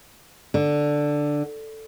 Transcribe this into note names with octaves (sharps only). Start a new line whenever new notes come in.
D3